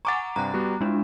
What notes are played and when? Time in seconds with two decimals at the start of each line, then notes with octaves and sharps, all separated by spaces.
0.05 F#5 G#5 A#5 C#6 D6 A6
0.36 G2 C3 G3 A#5 F#6
0.54 G3 B3 F#4
0.81 G#3 D4 E4 F4